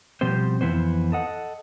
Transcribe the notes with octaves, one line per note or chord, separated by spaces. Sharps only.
B2 F3 G3 C4 C5
F2 C#3 E3 B3 C5
A4 D#5 F#5